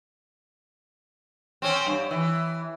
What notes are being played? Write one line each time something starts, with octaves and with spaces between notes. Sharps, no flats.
C4 C#4
G2
E3